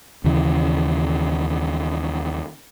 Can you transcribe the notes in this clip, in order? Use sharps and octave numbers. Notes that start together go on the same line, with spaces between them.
D#2 C#3 E3